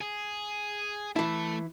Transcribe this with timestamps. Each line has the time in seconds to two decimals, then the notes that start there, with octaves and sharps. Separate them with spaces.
0.01 G#4
1.16 E3 A3 E4 A5